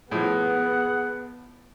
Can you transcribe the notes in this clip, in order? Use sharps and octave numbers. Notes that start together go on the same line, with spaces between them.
A2 F3 B3 G#4 F#5